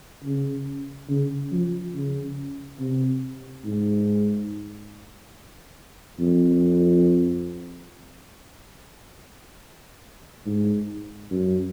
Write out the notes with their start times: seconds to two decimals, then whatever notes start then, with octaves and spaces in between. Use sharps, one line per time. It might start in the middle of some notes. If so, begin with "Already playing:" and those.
0.24 C#3
1.09 C#3
1.52 F3
1.95 C#3
2.79 C3
3.65 G#2
6.20 F2
10.46 G#2
11.31 F#2